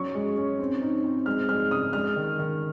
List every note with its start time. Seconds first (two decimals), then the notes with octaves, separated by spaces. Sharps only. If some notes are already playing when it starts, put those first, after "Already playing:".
Already playing: F#3 C#4 C#6
0.15 G#3
0.37 C#4
0.59 C4
0.82 D#4
1.04 C4
1.26 G#3 F6
1.49 G#3 F6
1.71 C#3 D#6
1.93 G#3 F6
2.16 D#3
2.39 D#3